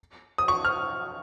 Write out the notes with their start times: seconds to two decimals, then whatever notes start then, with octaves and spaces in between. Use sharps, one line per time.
0.38 D#6
0.48 C#6
0.65 F6